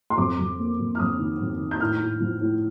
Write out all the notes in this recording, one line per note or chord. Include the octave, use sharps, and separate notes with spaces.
C6
F2 D6
F2
A#3
F2
F6
F2 D#6
D#3
F2
D#3
G6
A2 F6
A2
F3
A2